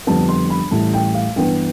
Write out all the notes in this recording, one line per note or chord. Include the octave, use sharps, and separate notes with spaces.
F2 D3 G3 B3 D4 A5
C6
B5
A1 A2 G3 A5
G5
F5
G2 E3 B3 G5